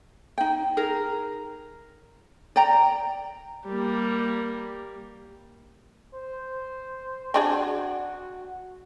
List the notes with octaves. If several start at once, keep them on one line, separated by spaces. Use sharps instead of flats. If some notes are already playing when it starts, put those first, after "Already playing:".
D#4 G5
D#4 G#4 A#4
D5 G5 A#5
G3 A#3
C5
C4 D4 F#4 G#4